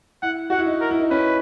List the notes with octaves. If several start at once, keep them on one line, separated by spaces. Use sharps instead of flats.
E4 F#5
F#4 F#5
E4
D#4
A#4
E4
D#4
C#4 B4